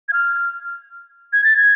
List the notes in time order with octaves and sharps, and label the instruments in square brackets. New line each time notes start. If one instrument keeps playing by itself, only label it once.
[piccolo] G#6
F6
G#6
A6
G#6